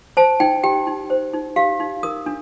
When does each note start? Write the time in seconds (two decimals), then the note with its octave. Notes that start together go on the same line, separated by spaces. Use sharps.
0.17 C5 A5
0.40 D#4 G5
0.63 G4 G5
0.87 D#4
1.10 C5
1.33 D#4
1.56 G4 F5
1.80 D#4
2.03 A#4 D#6
2.26 D4